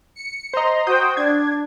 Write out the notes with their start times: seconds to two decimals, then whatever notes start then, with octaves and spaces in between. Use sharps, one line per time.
0.16 C#7
0.54 C5 D#5 A#5 C6
0.87 F#4 C5 G5 D#6 G6
1.17 D4 G#6